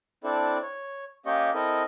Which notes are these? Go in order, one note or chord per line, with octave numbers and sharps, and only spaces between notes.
C4 D4 E4 A4 D5
C#5
A#3 C#4 G4 D#5 C#6
C4 E4 A4 A#4 D#5